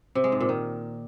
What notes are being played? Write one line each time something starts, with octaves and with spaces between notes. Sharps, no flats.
C3
G#3
G#2
A#2
D#3